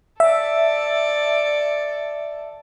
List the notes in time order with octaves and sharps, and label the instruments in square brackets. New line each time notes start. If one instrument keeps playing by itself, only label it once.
[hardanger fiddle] A4 D5 [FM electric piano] E5